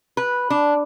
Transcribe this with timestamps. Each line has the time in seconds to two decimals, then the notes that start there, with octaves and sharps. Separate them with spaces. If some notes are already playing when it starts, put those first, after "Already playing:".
0.17 B4
0.50 D4